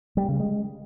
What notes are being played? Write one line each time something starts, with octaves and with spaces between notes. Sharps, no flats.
G3
C#3
G#3